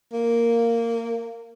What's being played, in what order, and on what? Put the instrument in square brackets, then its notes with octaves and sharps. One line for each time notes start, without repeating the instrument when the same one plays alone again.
[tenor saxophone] A#3